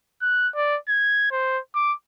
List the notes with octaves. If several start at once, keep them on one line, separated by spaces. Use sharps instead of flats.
F#6
D5
G#6
C5
D6